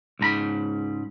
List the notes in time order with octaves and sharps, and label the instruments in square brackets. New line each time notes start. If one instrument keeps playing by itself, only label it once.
[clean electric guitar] C#2 G#2 A#5 B5